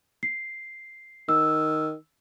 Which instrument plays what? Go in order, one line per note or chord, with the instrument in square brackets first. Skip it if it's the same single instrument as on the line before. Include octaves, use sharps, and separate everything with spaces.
[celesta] C7
[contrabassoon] D#3 [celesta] E6